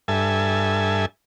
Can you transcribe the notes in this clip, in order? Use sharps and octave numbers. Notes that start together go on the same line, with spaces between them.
G2 A4 E5 G#5